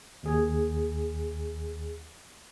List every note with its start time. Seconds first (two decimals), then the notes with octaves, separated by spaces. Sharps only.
0.23 D#2 G#4